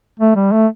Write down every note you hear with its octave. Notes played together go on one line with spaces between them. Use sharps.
A3
G3
A3